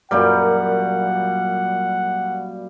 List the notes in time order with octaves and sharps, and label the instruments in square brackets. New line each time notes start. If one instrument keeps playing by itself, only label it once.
[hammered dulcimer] F#2 A#2 G3 [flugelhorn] F#5